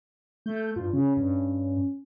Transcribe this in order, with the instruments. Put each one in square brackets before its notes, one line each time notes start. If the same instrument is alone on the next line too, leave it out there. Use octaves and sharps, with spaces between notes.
[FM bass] A3 [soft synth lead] G6
[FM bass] G2 [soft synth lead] F4
[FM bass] C#3 [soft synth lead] C#4
[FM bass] G2